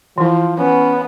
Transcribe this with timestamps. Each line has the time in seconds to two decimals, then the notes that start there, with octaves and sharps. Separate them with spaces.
0.18 E3 F3 E4
0.58 B3 C#4